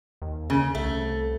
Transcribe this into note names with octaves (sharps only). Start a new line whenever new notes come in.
D#2
D#2 C#3
C2 A3